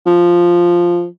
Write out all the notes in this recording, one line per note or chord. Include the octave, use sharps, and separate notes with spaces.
F3